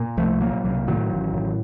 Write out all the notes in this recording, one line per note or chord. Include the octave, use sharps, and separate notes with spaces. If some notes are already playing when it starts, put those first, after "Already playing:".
Already playing: A#2
C2 F3 A3
A#2 F#3 A#3
C2 F#3 A#3
A2 D#3 F#3
A1
A2